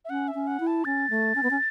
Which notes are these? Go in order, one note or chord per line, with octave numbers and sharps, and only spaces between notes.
E5
C#4 F#5
E5
C#4
F#5
E4
A5
C#4 A6
A3
C#4
B3
C#4